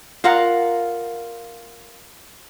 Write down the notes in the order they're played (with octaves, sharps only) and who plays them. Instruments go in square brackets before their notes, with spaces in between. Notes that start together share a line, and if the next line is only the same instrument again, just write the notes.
[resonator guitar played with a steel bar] F4 A#4 F5 F#5